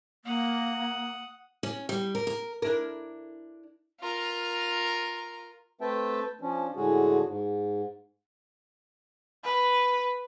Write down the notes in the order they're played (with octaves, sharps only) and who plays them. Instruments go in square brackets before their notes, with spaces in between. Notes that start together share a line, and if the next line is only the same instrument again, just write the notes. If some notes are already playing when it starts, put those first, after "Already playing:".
[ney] A#3 [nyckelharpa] F#5 D#6
[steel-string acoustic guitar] C#4
G3
A#4
A#4
[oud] D4 E4 A#4
[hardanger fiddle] F4 A#4
[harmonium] A3 C4 B4 E5 G5 A5
F3 C#4 D4
A2 D3 G#3 F#4 G#4
G#2
[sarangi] B4